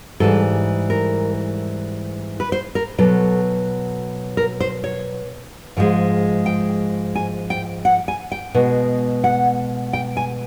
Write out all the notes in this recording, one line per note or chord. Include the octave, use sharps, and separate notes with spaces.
G#2 E3 G3 A4
A#4
B4
C5
A#4
B2 F#3 A4
A#4
C5
C#5
G#2 F3 G#3
G5
G#5
G5
F#5
G#5
G5
B2 G#3
F#5
G5
G#5